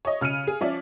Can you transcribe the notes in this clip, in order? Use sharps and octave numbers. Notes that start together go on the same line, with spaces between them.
C#5 D#5
C#3 F6 C#7 D#7
G#4
F3 C#4 D5 E5